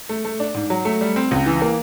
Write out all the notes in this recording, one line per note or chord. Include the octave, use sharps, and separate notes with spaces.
A3
A3
D4
G#2
F#3
A3
G3
C4
C#2
E3
A#3